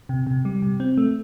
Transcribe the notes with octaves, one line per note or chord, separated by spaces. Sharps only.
C3
C3
G3
C3
C4
A3